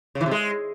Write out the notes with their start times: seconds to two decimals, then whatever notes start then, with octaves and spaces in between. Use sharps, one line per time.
0.15 C#3
0.21 E3
0.26 C3
0.31 G#3